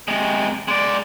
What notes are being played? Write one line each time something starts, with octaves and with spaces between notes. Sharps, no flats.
C3 G#3
G#3 D5